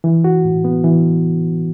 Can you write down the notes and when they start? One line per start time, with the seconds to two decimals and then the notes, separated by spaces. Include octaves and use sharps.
0.04 E3
0.24 F#4
0.45 A2
0.64 B3
0.84 E3